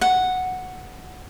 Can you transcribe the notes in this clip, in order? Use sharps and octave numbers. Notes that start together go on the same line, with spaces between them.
F#5